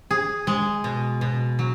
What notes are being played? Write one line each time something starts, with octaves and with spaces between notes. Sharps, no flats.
G#4
G#3
B2
B2
F#3